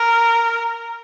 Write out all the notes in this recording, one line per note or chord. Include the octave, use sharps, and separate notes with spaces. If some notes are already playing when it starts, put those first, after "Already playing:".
Already playing: A#4